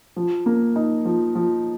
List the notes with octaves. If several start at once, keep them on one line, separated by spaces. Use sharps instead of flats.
F3
A#3
D#4
F3
F3